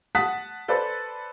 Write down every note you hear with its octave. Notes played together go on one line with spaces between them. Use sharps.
F#5 A5 D#6 F#6 B6
A4 B4 C5 D5